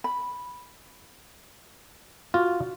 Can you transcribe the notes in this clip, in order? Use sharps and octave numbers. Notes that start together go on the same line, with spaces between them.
B5
F4 F#4